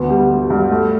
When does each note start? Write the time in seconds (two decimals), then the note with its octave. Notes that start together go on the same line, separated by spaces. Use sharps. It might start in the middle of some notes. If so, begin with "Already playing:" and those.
Already playing: D2 B3
0.10 G3
0.30 G2
0.50 G2
0.70 A3